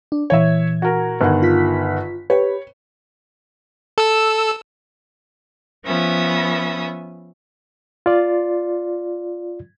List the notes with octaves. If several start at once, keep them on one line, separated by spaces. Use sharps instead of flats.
D4
A#2 E3 C#5 E5 G#6
F#4 A#4
G1 D#3 F#5
F4 B6
G4 B4 C#5
A4 E6
F3 B3 C#4 E5 D#6
F4 D5